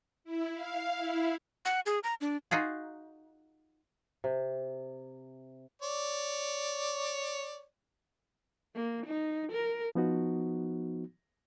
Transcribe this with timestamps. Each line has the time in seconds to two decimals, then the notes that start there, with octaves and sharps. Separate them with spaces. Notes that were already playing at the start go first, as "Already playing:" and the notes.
0.24 E4
0.54 F5
0.95 E4
1.65 F#5
1.86 G#4
2.04 A#5
2.21 D4
2.51 D#4 F4 F#4 G#4
4.24 C3
5.82 C#5 D5
8.75 A#3
9.06 D#4
9.52 A#4
9.95 F3 B3 D#4 F#4